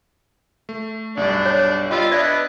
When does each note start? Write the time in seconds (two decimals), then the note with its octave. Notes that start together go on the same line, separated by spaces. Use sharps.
0.69 A3
1.17 B1 G2 D4
1.46 C#5
1.91 G3 F4 D#5 B5 E6
2.11 B3 D4 D5 E5